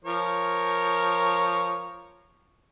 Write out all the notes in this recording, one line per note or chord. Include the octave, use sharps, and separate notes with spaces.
F3 A#4 C#5